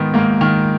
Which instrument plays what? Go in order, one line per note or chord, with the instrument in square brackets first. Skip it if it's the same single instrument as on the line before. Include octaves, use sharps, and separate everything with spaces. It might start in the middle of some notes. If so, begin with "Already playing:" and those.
Already playing: [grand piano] G#2 D#3 B3
G#2 A#3
D#3